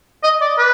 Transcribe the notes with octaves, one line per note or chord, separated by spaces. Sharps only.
D#5
D5
B4